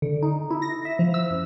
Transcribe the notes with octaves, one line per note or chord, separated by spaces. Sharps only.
D3
D#4
E4
A#6
E5
F3
E6
F#2